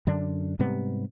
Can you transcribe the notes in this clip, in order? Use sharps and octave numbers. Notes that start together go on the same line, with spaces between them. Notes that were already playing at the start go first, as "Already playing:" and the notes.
F#2 D3 D4
G#2 C3 G3 B3